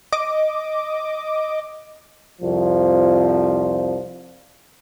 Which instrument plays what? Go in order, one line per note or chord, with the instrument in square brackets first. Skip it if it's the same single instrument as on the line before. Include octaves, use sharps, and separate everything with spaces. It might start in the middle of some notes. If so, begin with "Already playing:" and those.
[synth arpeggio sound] D#5 D6
[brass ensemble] C2 F2 F3